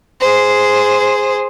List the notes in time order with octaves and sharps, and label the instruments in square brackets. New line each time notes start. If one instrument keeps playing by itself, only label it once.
[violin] G#4 C5